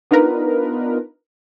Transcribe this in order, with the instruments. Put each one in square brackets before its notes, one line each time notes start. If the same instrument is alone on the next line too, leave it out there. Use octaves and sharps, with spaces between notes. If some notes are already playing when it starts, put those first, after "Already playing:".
[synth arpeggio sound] B3 D4 D#4 F4 A#4 B4